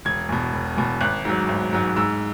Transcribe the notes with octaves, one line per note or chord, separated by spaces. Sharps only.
E1 G#6
E2 B2
E1
E2 B2
G#1 F#6
G#2 F#3
G#1
G#2 F#3
G#2 E6